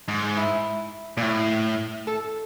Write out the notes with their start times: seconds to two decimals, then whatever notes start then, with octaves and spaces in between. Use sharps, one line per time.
0.08 G#2
0.37 E4
1.17 A#2
1.22 A2
2.07 A4